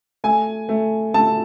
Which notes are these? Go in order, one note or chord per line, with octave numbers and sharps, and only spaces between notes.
A3 G#5
A3
A3 A5